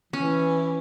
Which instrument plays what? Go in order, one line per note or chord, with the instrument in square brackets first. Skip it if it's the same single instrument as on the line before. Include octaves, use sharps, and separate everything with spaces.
[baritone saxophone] E3 [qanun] C#4